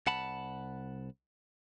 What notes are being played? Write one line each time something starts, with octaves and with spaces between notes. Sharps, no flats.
C2 F#5 A5 B5